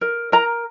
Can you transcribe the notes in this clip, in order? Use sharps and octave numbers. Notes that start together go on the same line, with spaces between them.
A#4
A#4 A#5